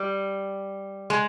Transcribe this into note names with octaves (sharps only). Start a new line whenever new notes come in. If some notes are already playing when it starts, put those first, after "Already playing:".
Already playing: G3
G#3